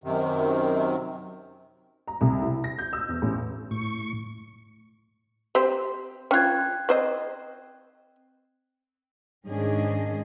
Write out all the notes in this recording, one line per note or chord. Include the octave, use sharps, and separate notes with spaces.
F#2 C3 D#3
A#5
C2
E4
A#6
G6
E6
E2
A1
A2 C#6
C4 G4 C5
C#4 F4 G5 F#6 G#6
C4 C5 D#5
G#2 D#3 C#4 D4 G#4 D#5